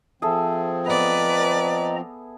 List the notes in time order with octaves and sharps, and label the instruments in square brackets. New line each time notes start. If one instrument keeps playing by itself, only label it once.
[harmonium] F3 C4 [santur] G#4 A4 E5
[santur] B3 [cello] B4 D5 [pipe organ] D#5 A#5